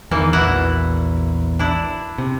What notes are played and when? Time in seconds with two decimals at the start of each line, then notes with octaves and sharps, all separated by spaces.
0.11 E2 D#3 E3 A#3
0.33 A#1 E2 E4 F#4 F#5
1.59 D4 E4
2.18 C3